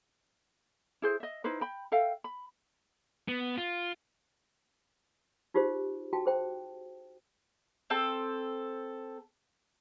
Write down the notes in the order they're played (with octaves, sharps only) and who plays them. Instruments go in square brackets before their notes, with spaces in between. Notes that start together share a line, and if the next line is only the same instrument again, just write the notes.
[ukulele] E4 G#4 C5
D#5 E5
D#4 E4 B4 C5
G5 B5
A4 E5 F5 G5
B5
[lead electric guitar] B3
F4
[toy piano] D#4 F4 G4 G#4 C5
F#4 G5 A5
G#4 C5 G5
[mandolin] C4 A4